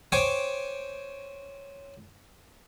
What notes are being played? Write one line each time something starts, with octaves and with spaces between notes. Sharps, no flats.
C5 C#5 G5 G#5 D6